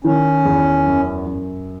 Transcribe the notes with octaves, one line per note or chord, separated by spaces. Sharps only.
D#3 C#4
E2
F#2
F#2